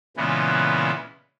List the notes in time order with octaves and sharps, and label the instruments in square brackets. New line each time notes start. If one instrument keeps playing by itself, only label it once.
[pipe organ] A#2 C#3 E3 G#3 B3